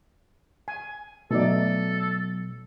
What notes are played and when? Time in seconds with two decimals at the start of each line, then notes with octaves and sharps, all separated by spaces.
0.68 G#5
1.31 B2 F#3 A3 D#4 A4 D5